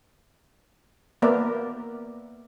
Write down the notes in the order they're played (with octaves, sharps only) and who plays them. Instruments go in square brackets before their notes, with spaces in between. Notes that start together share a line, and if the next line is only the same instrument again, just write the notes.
[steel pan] A#3 B3 A#4 D5 E5